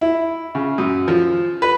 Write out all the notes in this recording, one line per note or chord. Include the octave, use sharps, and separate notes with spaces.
E4
C#3
F#2
F3
B4